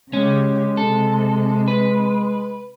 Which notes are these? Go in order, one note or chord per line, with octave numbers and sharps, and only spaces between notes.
C#3 G#3 C#4 G4
C3 A4
B4